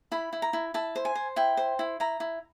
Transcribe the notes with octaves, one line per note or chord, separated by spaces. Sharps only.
E4 B5
E4
A#5
E4
E4 A5
C5
G#5
C5
E4 G5
C5
E4
E4 A#5
E4